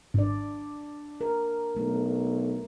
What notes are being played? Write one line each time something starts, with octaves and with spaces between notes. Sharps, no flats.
G#1 D4 D5
A#4
B1 A3